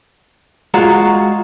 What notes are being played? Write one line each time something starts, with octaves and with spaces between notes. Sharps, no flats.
G#3 F4 F#4 A#5